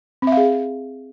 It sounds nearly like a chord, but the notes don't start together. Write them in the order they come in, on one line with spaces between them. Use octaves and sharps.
C4 E5 F5 G#4